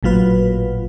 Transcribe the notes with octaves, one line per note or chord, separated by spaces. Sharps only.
A1 A#2 F#3 F4 B4